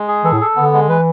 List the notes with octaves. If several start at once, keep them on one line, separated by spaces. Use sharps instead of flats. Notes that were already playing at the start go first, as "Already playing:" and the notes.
Already playing: G#3
G#4
E3 A4
A2
A4
D3 B3
G#3
E3 B4